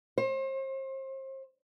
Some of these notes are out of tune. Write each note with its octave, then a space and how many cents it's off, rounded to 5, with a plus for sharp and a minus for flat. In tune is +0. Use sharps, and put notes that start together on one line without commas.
C5 +35